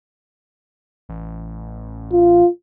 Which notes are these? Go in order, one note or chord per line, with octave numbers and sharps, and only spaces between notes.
A1
F4